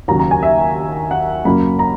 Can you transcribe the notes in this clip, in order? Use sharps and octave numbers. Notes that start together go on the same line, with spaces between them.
D#2 C#3 F#3 A#5
A#5
G#5
E5
F#5
F#2 C#3 F#3 A#3 B5
A#5